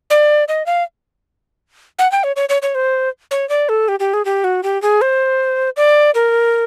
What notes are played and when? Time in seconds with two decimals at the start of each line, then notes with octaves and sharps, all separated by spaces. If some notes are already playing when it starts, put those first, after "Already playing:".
0.10 D5
0.48 D#5
0.66 F5
1.99 F#5
2.12 G5
2.24 C#5
2.36 C#5
2.49 C#5
2.62 C#5
2.75 C5
3.31 C#5
3.49 D5
3.69 A4
3.88 G4
4.00 G4
4.14 G#4
4.25 G4
4.44 F#4
4.63 G4
4.82 G#4
5.01 C5
5.77 D5
6.15 A#4